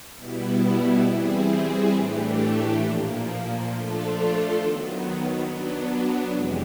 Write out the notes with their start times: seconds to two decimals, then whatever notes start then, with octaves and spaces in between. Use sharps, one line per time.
0.17 B2 G3 B3 E4
1.05 E3 G3 C4 E4 G#4
1.92 A2 E3 A3 D4 G4
2.80 A#2 F3 A#3
3.68 F3 A3 D4 F4 A4
4.56 D#3 F#3 B3
5.44 F#3 B3 D4
6.32 F2 C3 E3 G#3